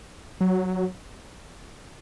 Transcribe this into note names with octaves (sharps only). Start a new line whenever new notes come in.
F#3